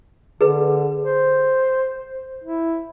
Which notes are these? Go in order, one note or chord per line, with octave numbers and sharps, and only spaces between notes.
D3 G#4 B4
C5
E4